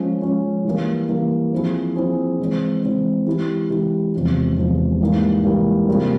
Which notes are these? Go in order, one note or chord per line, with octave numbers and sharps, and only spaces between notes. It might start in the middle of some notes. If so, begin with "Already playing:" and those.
Already playing: F3 G#3 C#4
F3 G#3 C#4
E3 G3 A#3
E3 G3 A#3
F3 C4 E4 G#4
F3 C4 E4 G#4
E3 G#3 C4
E3 G#3 C4
E3 G#3 E4 G4
E3 G#3 E4 G4
E2 C3 F3 G#3
E2 C3 F3 G#3
G#2 E3 G3 A#3
G#2 E3 G3 A#3
C3 G3 A#3 F4 G#4